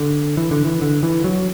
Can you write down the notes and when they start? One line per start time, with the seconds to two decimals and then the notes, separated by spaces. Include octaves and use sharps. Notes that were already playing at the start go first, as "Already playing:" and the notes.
Already playing: D3
0.37 E3
0.51 D3
0.65 E3
0.81 D3
1.03 E3
1.24 F#3